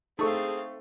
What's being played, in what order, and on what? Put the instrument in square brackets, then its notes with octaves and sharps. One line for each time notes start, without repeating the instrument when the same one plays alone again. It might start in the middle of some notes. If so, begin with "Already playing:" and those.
[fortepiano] A3 C#6 [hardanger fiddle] C4 F5 [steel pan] D#4 A4 [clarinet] G#4